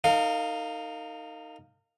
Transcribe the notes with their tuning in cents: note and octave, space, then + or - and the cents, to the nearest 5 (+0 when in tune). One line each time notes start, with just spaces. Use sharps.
D#4 +0 A#4 -40 F5 +0